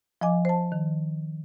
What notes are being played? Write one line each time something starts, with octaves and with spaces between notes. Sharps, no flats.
F3 D#5 G#5 D6
C5 A5
D#3